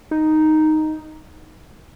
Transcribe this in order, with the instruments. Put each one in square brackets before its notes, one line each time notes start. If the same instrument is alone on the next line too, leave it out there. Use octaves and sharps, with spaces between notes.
[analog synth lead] D#4